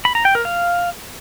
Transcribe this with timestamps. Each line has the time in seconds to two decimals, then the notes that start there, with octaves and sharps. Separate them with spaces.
0.05 B5
0.15 A#5
0.25 G5
0.35 A#4
0.45 F5